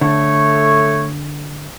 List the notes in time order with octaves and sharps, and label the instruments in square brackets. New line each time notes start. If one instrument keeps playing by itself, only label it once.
[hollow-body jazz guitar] D3 [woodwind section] A3 C#5